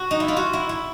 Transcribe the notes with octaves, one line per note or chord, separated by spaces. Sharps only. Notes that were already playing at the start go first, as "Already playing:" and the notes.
Already playing: F#4
D#4
E4
F4
F#4
E4
E4